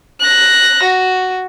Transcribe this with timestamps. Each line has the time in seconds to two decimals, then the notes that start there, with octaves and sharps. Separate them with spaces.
0.20 F#6 A#6
0.83 F#4